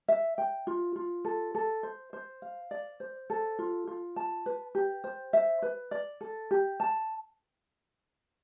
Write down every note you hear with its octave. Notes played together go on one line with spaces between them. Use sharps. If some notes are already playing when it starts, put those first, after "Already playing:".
E5
G5
F4
F4
A4
A4
C5
C5
F5
D5
C5
A4
F4
F4
A5
B4
G4
C5
E5
B4
D5
A4
G4
A5